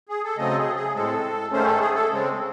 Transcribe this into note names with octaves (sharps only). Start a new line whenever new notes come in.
G#4
A4
C#3 F#3 A3 C4 D#5
A4
G#4
G#4
A2 G#3 C4 A4
G#2 D#3 A3 C#4 C5
A4
G#4
A4
C#3 G#3 C4